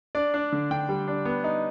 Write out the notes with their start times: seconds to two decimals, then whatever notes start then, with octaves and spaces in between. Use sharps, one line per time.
0.15 D4 D5
0.34 D4
0.52 D3
0.71 D3 G5
0.89 G3
1.08 D4
1.25 B3
1.44 D#4